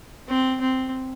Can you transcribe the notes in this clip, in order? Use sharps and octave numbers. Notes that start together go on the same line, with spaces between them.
C4
C4